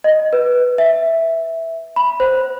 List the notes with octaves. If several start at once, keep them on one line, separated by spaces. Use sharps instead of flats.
D#5
B4
E5
B5
C5